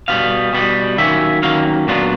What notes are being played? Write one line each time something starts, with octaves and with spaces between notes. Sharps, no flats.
B2 G3 B3 F5
B2 G3 B3
D#3 F#3 A#3 C#4 E5
D#3 F#3 A#3 C#4 F5
A#2 F#3 B3 D4 F4